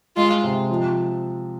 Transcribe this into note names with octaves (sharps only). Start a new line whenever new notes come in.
G#3 F4
C3
F3